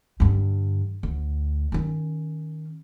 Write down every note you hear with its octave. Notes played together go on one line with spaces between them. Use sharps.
G2 D3
D2
D#3 C#4